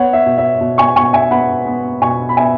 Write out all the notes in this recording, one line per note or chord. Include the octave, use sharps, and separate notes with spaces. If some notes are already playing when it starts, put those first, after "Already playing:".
Already playing: B3 C#5 F#5
E5
B2
E5
B2
G#5 C#6
B2 G#5 C#6
E5 G#5
B3 F#5 B5
B3
B2 G#5 C#6
B5
B3 E5 G#5